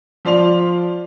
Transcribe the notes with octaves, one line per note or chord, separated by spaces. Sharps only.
F3 F4 D5 C6 F7